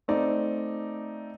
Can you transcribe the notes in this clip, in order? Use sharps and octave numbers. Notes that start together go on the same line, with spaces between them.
A3 C4 D#4 D5